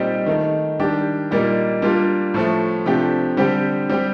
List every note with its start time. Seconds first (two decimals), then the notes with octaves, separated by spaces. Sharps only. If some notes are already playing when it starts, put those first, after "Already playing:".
Already playing: A#2 G3 C4 D#4 G4
0.26 D#3 A3 D#4
0.79 D#3 G3 D4 G4
1.31 A#2 G3 A#3 D#4
1.82 G3 A#3 D4 F4
2.34 A2 F3 A3
2.86 C3 F3 A3 D4 G4
3.37 D3 G3 C4 G4
3.90 G3 C4 G4